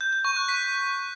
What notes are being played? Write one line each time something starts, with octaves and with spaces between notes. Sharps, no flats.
G6
G6
C#6
F#6
B6